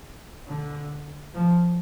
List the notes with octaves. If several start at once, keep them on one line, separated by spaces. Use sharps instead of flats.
D3
F3